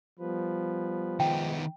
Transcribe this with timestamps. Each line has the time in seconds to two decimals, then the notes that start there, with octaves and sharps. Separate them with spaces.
0.19 F3 G3 B3 B4
1.20 D#3 G#3 B3 D#4 G5